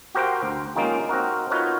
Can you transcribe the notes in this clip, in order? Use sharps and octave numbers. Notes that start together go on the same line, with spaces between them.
F#4 G4 A#4 C5 F5 G5
D2
G#3 A#3 C#4 D#4 F4 G4
C4 D#4 F#4 A#4
D#4 F4 F#4 A#4 B4 C#5